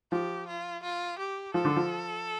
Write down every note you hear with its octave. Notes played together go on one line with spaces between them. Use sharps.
F3 G4
F4
F4
G4
F3 A4
D3
F3